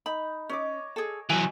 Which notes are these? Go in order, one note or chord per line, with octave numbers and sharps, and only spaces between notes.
D#4 B5
C#4 C#5 D#5 D6
G#4 A4
E3 F#3 G#5